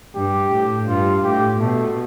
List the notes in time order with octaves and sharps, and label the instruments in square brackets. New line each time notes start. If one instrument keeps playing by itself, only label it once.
[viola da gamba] G2 [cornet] G4
[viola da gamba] A2
[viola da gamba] G2 [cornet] F4
[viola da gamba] A2 [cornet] G4
[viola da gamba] B2 [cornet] A3